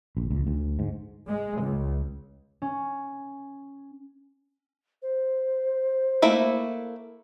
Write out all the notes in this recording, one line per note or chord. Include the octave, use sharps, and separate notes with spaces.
A#1
C#2
D2
G#2
G#3
C#2
C#4
C5
A3 A#3 E4